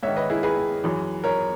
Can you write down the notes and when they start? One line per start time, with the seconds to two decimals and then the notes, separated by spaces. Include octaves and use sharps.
0.03 G#2 D#3 C#5 E5
0.16 B4 D#5
0.30 E4 G#4
0.43 G#4 B4
0.84 F#2 E3
1.24 A#4 C#5